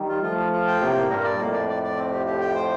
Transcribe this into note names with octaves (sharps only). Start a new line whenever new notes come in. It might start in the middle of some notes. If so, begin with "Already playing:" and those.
Already playing: D#3 G3
F4
F3 A3 F4
F4
F4
G5
A2 C3 A#3
A#3
G2 A#2 A#4
D5
F2 A2 A#3
D5
D5
D5
C4
G4
G4
G5
C5